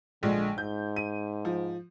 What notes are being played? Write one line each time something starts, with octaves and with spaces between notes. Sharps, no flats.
A#1 D3 G#3
G#2 G6
D#7
F3